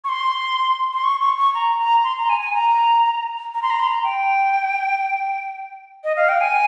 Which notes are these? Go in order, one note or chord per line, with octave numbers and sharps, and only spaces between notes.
C#6
C6
C6
C#6
C#6
C#6
A#5
A#5
C6
A#5
G#5
G#5
A#5
A#5
C6
A#5
C6
A#5
G5
D#5
F5
G5
G#5